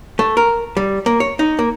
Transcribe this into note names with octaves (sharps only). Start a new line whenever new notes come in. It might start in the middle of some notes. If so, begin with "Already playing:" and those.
A3
A#4
G3
A#3
C#5
D#4
A#3